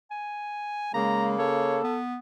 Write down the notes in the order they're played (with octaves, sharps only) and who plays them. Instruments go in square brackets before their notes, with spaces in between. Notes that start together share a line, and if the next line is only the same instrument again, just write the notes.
[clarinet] G#5
[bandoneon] C#3 A#3 [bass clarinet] G#3 [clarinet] A#5
[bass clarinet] A4 [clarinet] C#5
[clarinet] B3